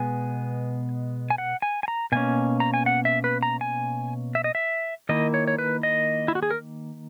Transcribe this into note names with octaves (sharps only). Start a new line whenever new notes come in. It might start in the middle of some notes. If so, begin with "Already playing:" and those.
Already playing: B2 G#3 B3 G#5
G#5
F#5
G#5
G#5
A#5
B2 A#3 C#4 G#5
A#5
G#5
F#5
E5
B4
A#5
G#5
E5
D#5
E5
D#3 A#3 E4 D#5
C#5
C#5
B4
D#5
E4
F#4
G#4
A#4